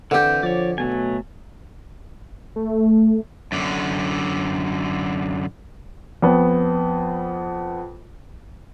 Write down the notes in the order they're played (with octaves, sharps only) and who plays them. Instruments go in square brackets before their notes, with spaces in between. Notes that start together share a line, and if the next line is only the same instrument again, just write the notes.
[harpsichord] D3 G4 [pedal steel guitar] E3 C4 G6
[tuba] F3 [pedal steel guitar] C#5 D5
[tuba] B2 [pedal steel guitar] F#3 A3 G#5
[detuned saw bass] A3
[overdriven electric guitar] F#2 D3
[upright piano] F2 B3